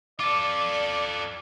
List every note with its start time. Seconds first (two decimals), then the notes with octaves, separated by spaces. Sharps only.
0.19 F4 A4 D5 D6